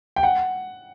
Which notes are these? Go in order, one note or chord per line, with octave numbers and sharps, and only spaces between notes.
G5
F#5